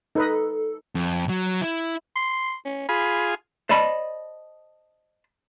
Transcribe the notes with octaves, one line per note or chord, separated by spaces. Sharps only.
D#4 A4 B4 D#5
F2
F#3
E4
C6
C#4
F4 G#4 B5
C5 D5 D#5 A5 B5